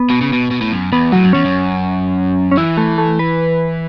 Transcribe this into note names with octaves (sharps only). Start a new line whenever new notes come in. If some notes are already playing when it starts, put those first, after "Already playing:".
Already playing: B3
B2
C#3
B2
B2
A2
F#2
E2 B3
A2 F#3
F#2
E2 C#4
F#2
C#4
E3 E4
A3
A3
B4